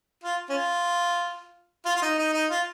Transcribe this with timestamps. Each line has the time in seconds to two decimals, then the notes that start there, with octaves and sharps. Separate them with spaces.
0.24 F4
0.50 C#4 F4
1.86 F4
1.96 F4
2.02 D#4
2.18 D#4
2.33 D#4
2.50 F4